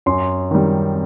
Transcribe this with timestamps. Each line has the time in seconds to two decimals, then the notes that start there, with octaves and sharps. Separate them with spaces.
0.06 F#2 C6
0.51 D#3 G3